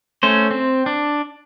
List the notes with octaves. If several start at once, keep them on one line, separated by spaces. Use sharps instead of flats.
A3 C#4 C5
C4
D4